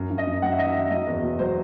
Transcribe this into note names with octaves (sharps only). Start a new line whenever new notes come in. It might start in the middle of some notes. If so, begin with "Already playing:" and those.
Already playing: F#2
F#2
D#5
F#2
F#3 F#5
E5
D#3 D#5
E5
D#3
F#3 D#5
E2
B2
F#3 C5